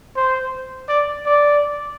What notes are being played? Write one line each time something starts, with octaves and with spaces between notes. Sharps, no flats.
C5
D5
D5